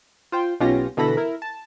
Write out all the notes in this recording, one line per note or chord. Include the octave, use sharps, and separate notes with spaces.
F4 C5 G5
B1 B2 C#4 F4 G4 A#6
B2 D3 E3 A4 B5 A#6
E4 A#4
A5